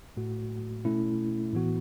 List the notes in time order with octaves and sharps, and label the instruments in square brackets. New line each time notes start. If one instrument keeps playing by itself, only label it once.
[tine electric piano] A2 A3 F#4
B2 A3 C#4 E4
A2 E3 B3 F#4